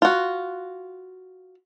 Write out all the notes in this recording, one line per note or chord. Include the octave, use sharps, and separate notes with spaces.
F4 F#4